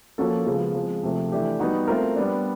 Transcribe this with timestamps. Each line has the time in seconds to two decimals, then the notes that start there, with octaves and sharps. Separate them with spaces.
0.18 F3 A#3 C#4 F#4 A4
0.46 C#3 F3 G#3 B3
0.75 F3 G#3 C4
1.03 C3 F3 A3
1.32 E3 A3 D4 G4
1.59 G3 B3 D#4 F#4
1.88 A3 C4 F4 A#4
2.16 G3 B3 D4